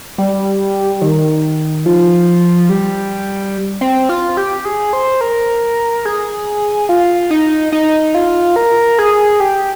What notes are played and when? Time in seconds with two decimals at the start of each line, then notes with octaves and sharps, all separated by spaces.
0.18 G3
1.02 D#3
1.86 F3
2.69 G3
3.81 C4
4.09 F4
4.37 G4
4.65 G#4
4.93 C5
5.21 A#4
6.05 G#4
6.89 F4
7.31 D#4
7.72 D#4
8.14 F4
8.56 A#4
8.99 G#4
9.40 G4